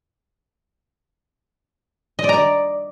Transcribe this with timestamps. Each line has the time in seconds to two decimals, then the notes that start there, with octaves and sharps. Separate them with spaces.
2.19 D#5
2.24 D5
2.29 A#5
2.34 D5